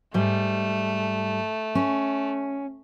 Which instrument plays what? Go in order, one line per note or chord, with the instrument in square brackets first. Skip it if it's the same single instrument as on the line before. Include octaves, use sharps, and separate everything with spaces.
[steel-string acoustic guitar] G#2 G3 [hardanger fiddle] A3
[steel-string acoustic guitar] C#4